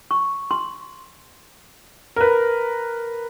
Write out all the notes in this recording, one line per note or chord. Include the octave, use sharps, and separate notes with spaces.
C#6
C6
A#4 B4